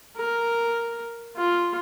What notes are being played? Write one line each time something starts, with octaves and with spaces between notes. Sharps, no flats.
A#4
F4